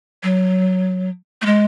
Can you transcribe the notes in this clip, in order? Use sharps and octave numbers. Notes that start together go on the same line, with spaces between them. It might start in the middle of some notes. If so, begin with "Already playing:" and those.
F#3
A3
G#3